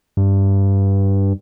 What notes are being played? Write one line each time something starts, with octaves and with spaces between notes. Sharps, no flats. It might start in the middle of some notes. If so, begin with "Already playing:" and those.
G2